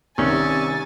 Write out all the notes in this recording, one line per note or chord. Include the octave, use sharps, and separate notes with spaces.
C2 D#3 C#4 D5 G#5 C#6 E6 A6